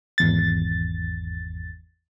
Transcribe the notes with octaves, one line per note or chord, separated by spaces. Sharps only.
G#1 E2 A6